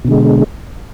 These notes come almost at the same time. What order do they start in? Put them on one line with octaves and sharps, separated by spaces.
B2 D3 G#3